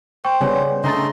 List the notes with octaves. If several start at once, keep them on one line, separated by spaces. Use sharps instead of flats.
C5 G5 C#6
C#3 G3 B3 C#5 G#5
C#3 A3 D4 D#5 A#5 C6 A6